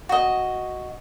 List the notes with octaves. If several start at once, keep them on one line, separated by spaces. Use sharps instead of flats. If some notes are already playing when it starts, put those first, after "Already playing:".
F#4 D#5